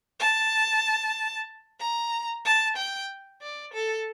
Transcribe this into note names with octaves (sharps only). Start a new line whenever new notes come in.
A5
A#5
A5
G5
D5
A4